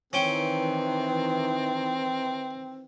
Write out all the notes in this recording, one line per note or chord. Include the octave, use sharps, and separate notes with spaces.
D#3 E3 C4 C#4 G5